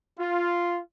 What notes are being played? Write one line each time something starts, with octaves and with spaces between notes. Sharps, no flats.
F4